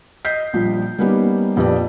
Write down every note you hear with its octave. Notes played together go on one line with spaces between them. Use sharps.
D#5 G6 B6 C7
A#1 F3 G3
G3 A#3 B3 C#4 D#4 G4
A#1 F2 G4 B4 D5